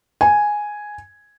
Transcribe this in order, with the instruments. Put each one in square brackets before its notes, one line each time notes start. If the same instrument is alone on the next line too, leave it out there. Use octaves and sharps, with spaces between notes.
[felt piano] G#5